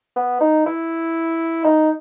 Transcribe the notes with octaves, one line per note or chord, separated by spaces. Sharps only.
B3
D#4
E4
D#4